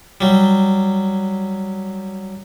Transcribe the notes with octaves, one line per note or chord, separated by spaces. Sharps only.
F#3 G3